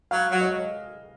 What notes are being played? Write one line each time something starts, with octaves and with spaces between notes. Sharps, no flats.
F#3 F5
F#3
D#5